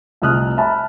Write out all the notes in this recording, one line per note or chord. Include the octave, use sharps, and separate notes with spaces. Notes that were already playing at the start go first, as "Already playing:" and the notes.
C2 F2 A3 D#6 F6 F#6
E5 A5 B5